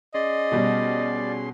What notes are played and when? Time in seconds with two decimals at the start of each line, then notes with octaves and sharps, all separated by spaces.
0.14 C#4 G#4 D5 D#5 C6
0.52 B2 G3